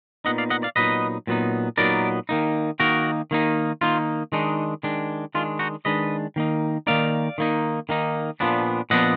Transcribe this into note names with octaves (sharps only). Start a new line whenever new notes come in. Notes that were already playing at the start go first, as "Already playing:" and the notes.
A#2 F#3 B3 D#4 D#5 F#5
D5 F5
D#5 F#5
D5 F5
A#2 F#3 B3 D#4 B4 D#5
A#2 F#3 B3 D#4
A#2 F#3 B3 D#4 A#4 D5
D#3 A#3 D#4
D#3 A#3 D#4 F#4 A#4
D#3 A#3 D#4
D#3 A#3 D#4 F4
D#3 G#3 D4 D#4
D#3 G#3 D4
D#3 G#3 D4 F4
D#4 F#4
D#3 G#3 D4 B4 D#5
D#3 A#3 D#4
D#3 A#3 D#4 D5 F5
D#3 A#3 D#4
D#3 A#3 D#4
A#2 F3 B3 D4
A#2 F3 B3 D4 D#5 F#5